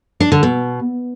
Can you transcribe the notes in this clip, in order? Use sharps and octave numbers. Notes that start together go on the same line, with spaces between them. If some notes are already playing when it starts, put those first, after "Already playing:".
D4
D3
B2